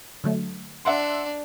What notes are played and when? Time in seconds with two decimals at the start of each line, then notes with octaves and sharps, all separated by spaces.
0.24 D3 F#3 A3
0.85 D4 E5 F#5 C6